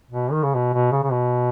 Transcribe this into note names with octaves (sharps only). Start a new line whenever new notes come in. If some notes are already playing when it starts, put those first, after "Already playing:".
B2
D#3
C#3
B2
B2
C#3
C#3
B2